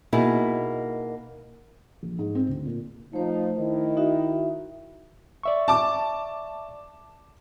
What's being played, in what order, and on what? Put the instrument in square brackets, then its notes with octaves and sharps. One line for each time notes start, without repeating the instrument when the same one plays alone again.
[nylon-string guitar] B2 A#3 D#4 E4 G#4
[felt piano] A#1
G#2
C4
D2
A#2
[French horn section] F3 D#4 [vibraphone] A3 C5
[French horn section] D#3 E4
[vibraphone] D#4 F#4 E5
[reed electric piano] D5 E5 C#6
[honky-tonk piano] A5 D6